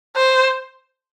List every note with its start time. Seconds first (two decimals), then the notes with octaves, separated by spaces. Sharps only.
0.16 C5